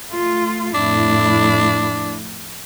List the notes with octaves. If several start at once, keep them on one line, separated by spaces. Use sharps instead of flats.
A3 F4
F2 A2 D4 E4